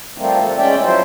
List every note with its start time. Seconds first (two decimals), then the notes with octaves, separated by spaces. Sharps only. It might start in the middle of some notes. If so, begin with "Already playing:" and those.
0.18 F3 G3 A3 A#3 C4
0.42 C3 F3 A4
0.58 G#3 C#4 D5 E5 G5
0.82 F3 F#3 E4 C5